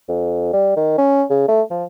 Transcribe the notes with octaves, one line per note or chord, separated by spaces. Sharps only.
F2
G3
D#3
C#4
C#3
A3
F3